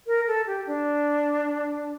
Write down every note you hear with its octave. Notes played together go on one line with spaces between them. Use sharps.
A#4
A4
G4
D4